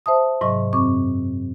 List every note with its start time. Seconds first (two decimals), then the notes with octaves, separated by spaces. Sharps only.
0.06 C5 E5 A5 D#6
0.41 G#2 C3 F#3 D#5 C#6
0.73 F#2 C4 C#6 D6